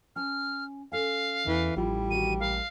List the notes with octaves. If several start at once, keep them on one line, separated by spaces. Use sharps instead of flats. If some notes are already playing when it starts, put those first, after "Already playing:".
C#4 A5 F6
C#4 A4 F5 G#5
E2 E3
A1 F3 G3 E4 F4
D#3 C4 F#4 D#7
A#2 A#4 F5 A5